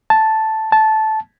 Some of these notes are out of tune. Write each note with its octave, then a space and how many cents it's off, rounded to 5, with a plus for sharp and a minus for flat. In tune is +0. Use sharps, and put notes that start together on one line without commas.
A5 +0
A5 -10